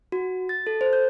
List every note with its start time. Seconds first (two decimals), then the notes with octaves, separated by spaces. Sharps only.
0.12 F#4
0.49 A6
0.67 A4
0.81 C5
0.93 G6